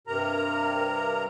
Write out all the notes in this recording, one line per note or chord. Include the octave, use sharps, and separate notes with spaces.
G2 C3 A#4 A#5